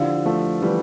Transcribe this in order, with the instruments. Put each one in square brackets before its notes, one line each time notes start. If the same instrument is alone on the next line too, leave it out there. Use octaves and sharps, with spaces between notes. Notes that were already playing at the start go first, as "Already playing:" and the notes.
Already playing: [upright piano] D3 F3 [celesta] E4 G4 D5 F5
[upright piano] F3 A3
E3 G3